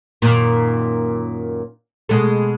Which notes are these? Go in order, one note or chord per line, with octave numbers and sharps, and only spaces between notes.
F#2 A#2 D#3
B2 G#3 A4